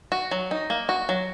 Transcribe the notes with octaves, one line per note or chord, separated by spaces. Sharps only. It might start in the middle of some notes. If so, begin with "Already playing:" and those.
F#4
F#3
D#4
A#3
F#4
F#3